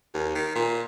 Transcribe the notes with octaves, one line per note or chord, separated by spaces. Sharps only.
D#2
D#3
A#2